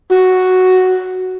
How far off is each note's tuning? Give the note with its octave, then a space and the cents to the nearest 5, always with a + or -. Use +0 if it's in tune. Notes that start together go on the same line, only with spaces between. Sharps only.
F#4 +0